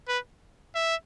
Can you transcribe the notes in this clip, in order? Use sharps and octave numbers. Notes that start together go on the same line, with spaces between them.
B4
E5